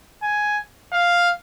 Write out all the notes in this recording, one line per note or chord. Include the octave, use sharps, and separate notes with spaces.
G#5
F5